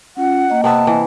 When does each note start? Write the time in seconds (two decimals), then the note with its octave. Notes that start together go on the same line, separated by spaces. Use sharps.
0.17 C#4 F4 F#5
0.50 A#3 D#5
0.64 C3 B3 E5 A5
0.87 E3